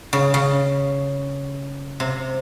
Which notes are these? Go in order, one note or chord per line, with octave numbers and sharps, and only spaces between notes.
C#3
C#3
C3